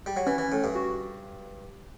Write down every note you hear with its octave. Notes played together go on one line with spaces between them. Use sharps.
G3
F#3
E3 C#4
E3
A2
G2
F#4